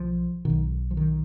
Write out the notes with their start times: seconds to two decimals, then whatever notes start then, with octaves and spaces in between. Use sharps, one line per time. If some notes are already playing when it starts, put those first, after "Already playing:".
Already playing: B1 F3
0.45 B1 B2 D#3
0.91 F3
0.97 D#3